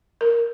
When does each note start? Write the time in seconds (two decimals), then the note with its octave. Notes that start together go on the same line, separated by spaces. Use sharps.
0.21 A#4